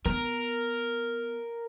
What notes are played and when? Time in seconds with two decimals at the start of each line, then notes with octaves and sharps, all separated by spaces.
0.06 B3 A#4